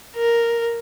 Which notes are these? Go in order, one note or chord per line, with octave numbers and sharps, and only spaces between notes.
A#4